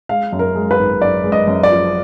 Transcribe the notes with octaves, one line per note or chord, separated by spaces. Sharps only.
G#3 F5
F#2
A#4
G#3
B4
G#1
F#2 D5
G#3
D#5
F#2
D5
F3